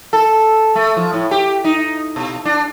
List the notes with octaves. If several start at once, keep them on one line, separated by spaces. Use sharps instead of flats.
A4
A3
F3
A2
G4
D#4
B2
D4